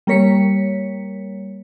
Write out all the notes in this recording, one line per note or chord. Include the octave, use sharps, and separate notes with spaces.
G3 A#3 A#4 C#5 B6 C#7